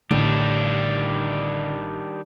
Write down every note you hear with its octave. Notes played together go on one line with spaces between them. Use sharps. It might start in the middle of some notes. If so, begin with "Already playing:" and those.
A1 D3 D#3 G3 D4